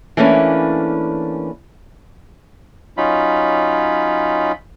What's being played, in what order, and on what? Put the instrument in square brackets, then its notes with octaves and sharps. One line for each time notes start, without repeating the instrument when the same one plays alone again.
[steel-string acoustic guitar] E3 A3 A#3 C#4 D4 B4
[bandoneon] F#3 C#4 D#4 F4 B5